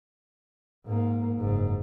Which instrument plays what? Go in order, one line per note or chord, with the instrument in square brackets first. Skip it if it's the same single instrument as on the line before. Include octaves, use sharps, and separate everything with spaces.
[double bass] G#2 A#3
F#1 G#2